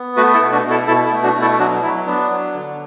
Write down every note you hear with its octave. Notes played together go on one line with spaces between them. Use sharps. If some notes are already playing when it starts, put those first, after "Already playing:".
Already playing: B3
A3 F#4 B4
E4 A4
B2
D4 F#4
B2
E4 A4
B2 E4 A4
E4
A3
D4 F#4
B2
E4 A4
F#3 D4 F#4
F#3 E4
B3 D4
F#3
D3